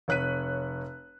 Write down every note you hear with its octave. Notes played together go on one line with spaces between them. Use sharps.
F1 C#5 F#6 B6 D#7